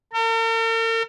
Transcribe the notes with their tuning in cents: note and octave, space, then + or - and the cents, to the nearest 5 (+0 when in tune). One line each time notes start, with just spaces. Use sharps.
A#4 -45